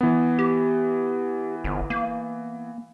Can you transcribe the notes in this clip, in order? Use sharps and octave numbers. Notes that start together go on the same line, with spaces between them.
E3 B3
G4
G1
A#3